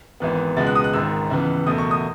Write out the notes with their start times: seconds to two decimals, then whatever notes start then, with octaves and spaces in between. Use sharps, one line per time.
0.20 G#1 G#2 E3 B3
0.57 C#2 B2 G#3 B3 A6
0.67 F#6
0.75 D#6
0.84 F#6
0.93 G#1 G#2 D#3 E6
1.30 C#2 C#3 E3 B3
1.66 F#1 E2 B2 A3 D#6
1.78 C#6
1.91 D#6